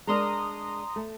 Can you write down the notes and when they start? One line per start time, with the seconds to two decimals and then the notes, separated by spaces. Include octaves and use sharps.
0.07 G#3 D4 A#4 A#5 C6 D#6
0.96 A3